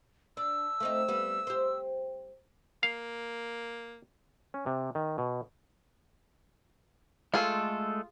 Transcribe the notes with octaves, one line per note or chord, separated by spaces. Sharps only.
D4 E6
A3 C4 D#4
G3 B3
G4 C5
A#3 F5
C#4
C3
D#3
B2
G#3 A3 F4 G#4 A4